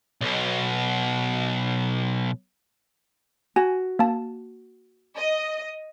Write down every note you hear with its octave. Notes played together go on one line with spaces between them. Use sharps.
B1 B2
F#4 G#5
A#3 A5
D#5